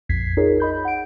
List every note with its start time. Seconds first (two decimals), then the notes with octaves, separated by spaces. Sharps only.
0.09 A#1 F2 G#6 B6 C7
0.37 D#4 F4 G#4 A#4 C#5
0.60 D#5 B5 G6
0.85 F#5 D7